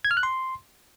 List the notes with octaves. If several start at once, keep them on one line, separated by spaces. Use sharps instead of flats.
G#6
F6
F#6
C6